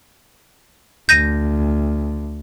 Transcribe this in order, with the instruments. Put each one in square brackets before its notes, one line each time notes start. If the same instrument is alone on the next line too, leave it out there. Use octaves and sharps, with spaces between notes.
[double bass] D2 [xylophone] G6 A#6 D#7